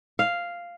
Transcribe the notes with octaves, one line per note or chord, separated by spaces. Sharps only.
F5